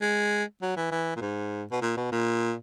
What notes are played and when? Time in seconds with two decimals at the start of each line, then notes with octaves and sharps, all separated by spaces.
0.02 G#3
0.62 F#3
0.77 E3
0.92 E3
1.16 A#2
1.22 G#2
1.71 B2
1.82 A#2
1.97 B2
2.12 A#2